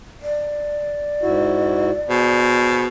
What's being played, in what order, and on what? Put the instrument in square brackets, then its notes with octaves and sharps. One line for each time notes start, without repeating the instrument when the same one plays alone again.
[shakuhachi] D5
[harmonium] G#2 E4 F#4
[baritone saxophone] B2 [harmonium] G#4 C5